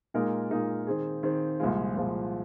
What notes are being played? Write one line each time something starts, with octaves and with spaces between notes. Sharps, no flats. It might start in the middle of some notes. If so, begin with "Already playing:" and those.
A#2 G#3 D#4 A#4
A#2 G#3 D#4 A#4
D#3 C4 G#4
D#3 C4 G#4
C2 A#2 F3 G#3 F4
C2 A#2 F3 G#3 F4